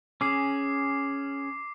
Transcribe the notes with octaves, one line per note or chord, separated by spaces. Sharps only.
C#4 G#4 D6 C7